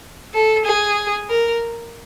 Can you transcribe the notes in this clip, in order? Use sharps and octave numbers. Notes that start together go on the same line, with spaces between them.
A4
G#4
A#4